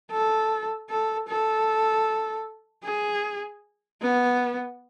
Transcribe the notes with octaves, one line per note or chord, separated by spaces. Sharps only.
A4
A4
A4
G#4
B3